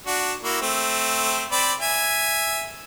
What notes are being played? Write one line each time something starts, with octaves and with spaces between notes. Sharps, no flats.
D4 F#4
A#3 E4 F#4
A3 C4
C4 D5 B5
E5 G#5